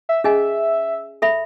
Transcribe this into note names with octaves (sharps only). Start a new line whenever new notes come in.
E5
C#4 G#4 D#5 E5 G#5
A4 E5 B5